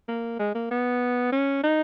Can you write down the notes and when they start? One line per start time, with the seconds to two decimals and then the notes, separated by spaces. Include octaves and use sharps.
0.09 A#3
0.39 G#3
0.55 A#3
0.71 B3
1.32 C#4
1.64 D#4